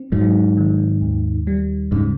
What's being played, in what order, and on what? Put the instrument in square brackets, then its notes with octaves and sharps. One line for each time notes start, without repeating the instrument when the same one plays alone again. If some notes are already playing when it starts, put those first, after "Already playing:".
Already playing: [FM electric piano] C4
[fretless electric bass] G#2 [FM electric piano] F#3
[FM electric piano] D#3
D#2
G3
[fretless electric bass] G#2 [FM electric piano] C#3